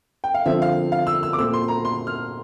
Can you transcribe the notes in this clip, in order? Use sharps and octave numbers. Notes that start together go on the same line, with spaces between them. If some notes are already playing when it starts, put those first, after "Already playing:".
G5
F5
D3 F3 C4 E5
F5
F5
E6
E6
D6
A#2 A3 C4 E6
C6
A#5
C6
F6